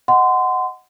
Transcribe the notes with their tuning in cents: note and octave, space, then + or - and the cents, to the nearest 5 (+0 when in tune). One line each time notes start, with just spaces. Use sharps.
D#5 +0 F#5 +0 C6 -25